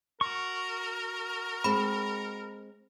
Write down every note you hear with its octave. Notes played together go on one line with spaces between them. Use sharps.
F#4 A#4 C#6
G#3 C4 B5